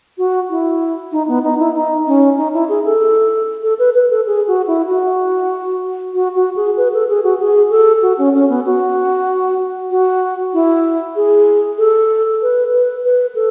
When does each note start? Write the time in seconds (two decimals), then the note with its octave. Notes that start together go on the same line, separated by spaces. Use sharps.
0.18 F#4
0.50 E4
1.12 D#4
1.28 B3
1.44 D#4
1.59 E4
1.75 D#4
2.07 C#4
2.37 D#4
2.53 E4
2.69 G#4
2.85 A4
3.63 A4
3.79 B4
3.94 B4
4.10 A4
4.27 G#4
4.47 F#4
4.67 E4
4.89 F#4
6.14 F#4
6.35 F#4
6.56 G#4
6.77 B4
6.93 A4
7.09 G#4
7.24 F#4
7.40 G#4
7.71 A4
8.02 F#4
8.18 C#4
8.34 C#4
8.49 B3
8.66 F#4
9.91 F#4
10.54 E4
11.16 G#4
11.78 A4
12.42 B4
12.73 B4
13.04 B4
13.35 A4